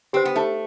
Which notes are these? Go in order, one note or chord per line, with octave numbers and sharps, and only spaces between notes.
C4 G4 C5
B3
A3 D#4